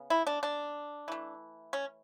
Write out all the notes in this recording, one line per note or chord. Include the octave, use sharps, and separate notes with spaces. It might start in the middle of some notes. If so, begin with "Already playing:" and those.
Already playing: C#3 B3
E4
D4
D4
E3 A3
C#4